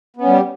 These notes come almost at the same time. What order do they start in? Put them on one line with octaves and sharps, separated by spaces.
B3 C#4 G3 G4